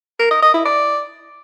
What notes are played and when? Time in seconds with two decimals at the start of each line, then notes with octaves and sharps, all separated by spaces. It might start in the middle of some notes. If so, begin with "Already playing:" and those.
0.19 A#4
0.31 D#5
0.42 D#5
0.54 E4
0.65 D5